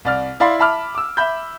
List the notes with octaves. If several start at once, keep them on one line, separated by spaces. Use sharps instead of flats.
C2 D5 F6
E4 D5 F5 B5 C6
E5 A5 B5 D6 F6
D6 E6
E5 B5 G6